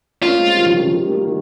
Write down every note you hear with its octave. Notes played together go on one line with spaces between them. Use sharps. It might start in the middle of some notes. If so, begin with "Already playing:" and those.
A#3 C#4 F4
G#3 C4
D#3 G3
C#3 F3
D#3 G3
C#3 F3
D#3 G3
G3 A#3
D#3 G3